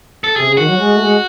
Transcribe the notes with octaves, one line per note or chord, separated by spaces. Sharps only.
A4
C3 G#4
C#3
D#3 F#4
F#3
G#3
A3
G#3